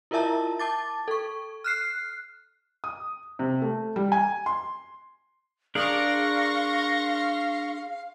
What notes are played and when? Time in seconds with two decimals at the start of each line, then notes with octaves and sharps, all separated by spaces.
0.11 E4 F4 A#4 E5 A5 A#5
0.59 A5 D6 A6
1.08 A4 C#6
1.64 F6 F#6 C7
2.84 D#6
3.39 C3
3.62 A3
3.96 G3
4.12 G#5
4.46 C6
5.75 D4 G#4 A#4 D5 F5 C6 C#6 A#6